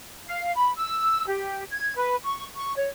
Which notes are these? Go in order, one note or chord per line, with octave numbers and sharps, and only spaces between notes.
F5
B5
E6
G4
G#6
B4
C#6
C#6
C#5